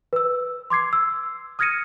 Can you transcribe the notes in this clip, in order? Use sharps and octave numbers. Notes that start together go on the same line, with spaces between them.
B4 E6
C6 D6 G#6 C7
E6
D#6 F6 G#6 A#6 C#7 D#7